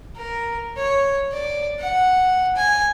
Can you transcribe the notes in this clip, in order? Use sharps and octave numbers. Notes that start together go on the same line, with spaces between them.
A#4
C#5
D5
F#5
G#5